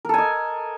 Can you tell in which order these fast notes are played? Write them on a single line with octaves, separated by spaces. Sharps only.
A#4 A4 G#5 D#5